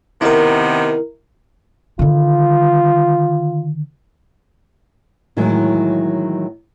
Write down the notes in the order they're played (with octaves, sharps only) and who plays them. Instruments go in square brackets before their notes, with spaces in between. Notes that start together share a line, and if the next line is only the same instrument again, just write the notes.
[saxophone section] C3 D#3 B3 [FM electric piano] E4 A#4
[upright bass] D3 D#3 [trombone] F4
[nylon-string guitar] A2 D#3 E3 F#3 G#3